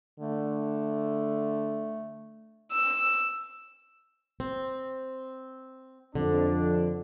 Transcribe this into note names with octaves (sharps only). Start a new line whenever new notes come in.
D3 A3
E6
C4
F2 D3 D4